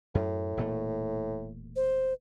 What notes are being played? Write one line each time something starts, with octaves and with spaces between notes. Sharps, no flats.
F#2 A2
E1 A#2 A3
C5